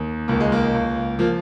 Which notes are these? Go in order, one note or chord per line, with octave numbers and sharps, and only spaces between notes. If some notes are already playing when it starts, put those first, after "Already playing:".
Already playing: D#2
C#2 A#3
G#3
A#3
C#2
F3 A#3